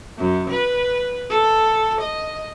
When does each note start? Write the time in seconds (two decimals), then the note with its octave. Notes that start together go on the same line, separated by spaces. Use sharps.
0.18 F#2
0.50 B4
1.30 A4
2.01 D#5